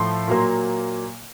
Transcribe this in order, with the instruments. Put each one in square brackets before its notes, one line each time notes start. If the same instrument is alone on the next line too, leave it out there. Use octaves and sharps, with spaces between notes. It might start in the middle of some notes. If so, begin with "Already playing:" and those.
Already playing: [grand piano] A2 F3 A3 C6
A#2 F#3 A#3